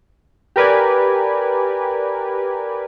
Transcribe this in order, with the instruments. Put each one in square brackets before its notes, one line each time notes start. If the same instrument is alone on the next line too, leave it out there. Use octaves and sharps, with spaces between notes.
[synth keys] G4 A#4 B4 D5 G#5